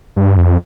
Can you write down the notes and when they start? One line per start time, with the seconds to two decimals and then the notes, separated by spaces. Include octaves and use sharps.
0.16 G2
0.37 F2